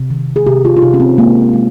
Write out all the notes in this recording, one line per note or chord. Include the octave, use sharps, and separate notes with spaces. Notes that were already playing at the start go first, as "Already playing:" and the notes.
Already playing: C3
D#3
G#4
C3 G4
F4
F4
C3 D#4
C#4
C4
G#3 A#3
G#3